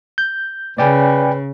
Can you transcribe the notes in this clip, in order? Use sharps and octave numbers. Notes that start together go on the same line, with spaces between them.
G6
C#3 B4 D5 G5 G#5